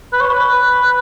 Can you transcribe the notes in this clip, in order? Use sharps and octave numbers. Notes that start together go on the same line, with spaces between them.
B4
C#5
B4